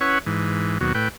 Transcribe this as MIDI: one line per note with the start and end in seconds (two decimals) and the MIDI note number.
0.01 0.19 61
0.01 0.19 64
0.01 0.19 71
0.01 0.19 73
0.01 0.19 78
0.26 0.78 44
0.26 0.78 52
0.81 0.93 39
0.81 0.93 47
0.81 0.93 54
0.95 1.08 45
0.95 1.08 71
0.95 1.08 79